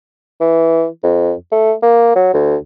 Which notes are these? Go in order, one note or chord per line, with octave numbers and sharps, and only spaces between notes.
E3
F2
A3
A#3
F#3
D2